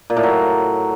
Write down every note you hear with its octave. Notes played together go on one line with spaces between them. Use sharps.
A#2
A2
F#3